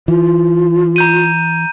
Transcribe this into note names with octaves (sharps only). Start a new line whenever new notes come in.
E3 F4
A#5 G6 D#7